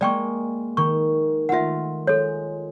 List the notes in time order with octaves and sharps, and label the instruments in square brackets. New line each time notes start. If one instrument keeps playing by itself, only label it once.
[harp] G#3 A#3 [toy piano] D5 G5 C#6
[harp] D#3 [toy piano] C#6
[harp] A3 F4 [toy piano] E5 F#5
[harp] G#3 [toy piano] A4 C#5